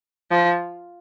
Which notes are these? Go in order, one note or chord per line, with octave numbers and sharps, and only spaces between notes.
F3